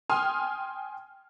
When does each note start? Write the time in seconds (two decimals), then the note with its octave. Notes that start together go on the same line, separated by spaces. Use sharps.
0.09 G5 G#5 C6 D#6 F6